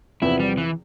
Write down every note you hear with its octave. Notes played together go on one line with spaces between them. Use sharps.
E2 C3 F3 B3 E4
G3
E3